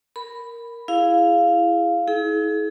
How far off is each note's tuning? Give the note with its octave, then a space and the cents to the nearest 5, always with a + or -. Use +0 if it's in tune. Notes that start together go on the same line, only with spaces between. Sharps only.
A#4 +0 B5 +0
E4 +15 G#4 +0 F5 +0
E4 -40 G#4 +35